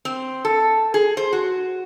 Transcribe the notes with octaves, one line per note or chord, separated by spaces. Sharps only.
C4
A4
G#4
C5
F#4